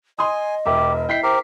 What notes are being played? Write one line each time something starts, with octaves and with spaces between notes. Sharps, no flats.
D#5 G#5 C6 D#6
E1 G4 A#4 E5
E4 G5 B6 C7
G4 A#4 C5